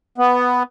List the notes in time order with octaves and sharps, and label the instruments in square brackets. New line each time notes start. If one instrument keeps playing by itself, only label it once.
[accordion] B3